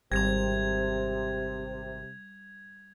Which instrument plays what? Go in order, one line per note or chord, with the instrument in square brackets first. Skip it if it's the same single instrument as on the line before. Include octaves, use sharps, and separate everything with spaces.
[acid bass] G#1 [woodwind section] C3 [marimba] G3 [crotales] G#6 F7